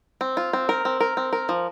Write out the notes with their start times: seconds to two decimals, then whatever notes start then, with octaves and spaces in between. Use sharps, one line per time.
0.21 C4
0.37 F4
0.53 C4
0.69 A#4
0.85 C4
1.00 A#4
1.17 C4
1.33 A#4
1.49 F3